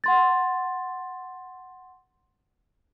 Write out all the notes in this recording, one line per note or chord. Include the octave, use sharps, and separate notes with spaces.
F#5 C6 A6